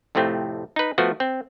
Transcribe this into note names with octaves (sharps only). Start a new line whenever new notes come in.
F2 A2 C3 A3 C4
D#4 B4
F3 A3 B3 F#4
C4